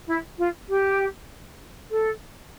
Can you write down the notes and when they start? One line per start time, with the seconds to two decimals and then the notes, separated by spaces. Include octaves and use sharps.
0.08 E4
0.38 F4
0.69 G4
1.91 A4